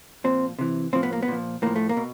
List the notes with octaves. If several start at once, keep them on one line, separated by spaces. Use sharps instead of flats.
A#2 F3 C4
C3 E3
A2 F3 C4
B3
A#3
B3
A#2 F3
A2 F3 A#3
A3
A#3
B2